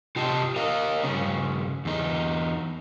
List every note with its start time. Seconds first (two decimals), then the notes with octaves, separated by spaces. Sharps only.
0.16 C3 F4 G4 D#5 G5 A5
0.56 A#4 D#5 F5
1.04 G2 A#2 C#3 C#4
1.85 E2 D#4